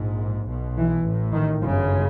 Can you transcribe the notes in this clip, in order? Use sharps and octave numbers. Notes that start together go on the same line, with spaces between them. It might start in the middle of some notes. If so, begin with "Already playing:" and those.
Already playing: A#1 G#2
B1 B2
E3
A1 A2
D#3
G1 F#2 C#3 F3